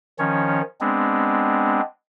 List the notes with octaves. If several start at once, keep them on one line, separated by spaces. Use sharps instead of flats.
D#3 F3 C#4 C#5
G#3 B3 C4 D4